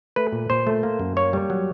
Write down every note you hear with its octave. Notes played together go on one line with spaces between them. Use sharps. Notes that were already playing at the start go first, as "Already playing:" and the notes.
A3 B4
A#2
A#2 C5
A3
A#3
F#2
A#3 C#5
G3
F#3